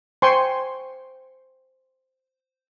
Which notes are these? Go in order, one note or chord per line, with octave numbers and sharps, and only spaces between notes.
C5 G5 G#5 C6 C#6